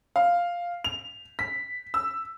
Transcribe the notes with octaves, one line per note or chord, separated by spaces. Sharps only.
F5
F7
B6
E6